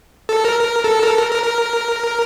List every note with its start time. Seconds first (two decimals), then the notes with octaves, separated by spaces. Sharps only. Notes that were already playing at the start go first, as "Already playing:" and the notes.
0.29 A4
0.45 A#4
0.61 A#4
0.84 A4
1.03 A#4
1.07 A4
1.19 A#4
1.31 A#4
1.43 A#4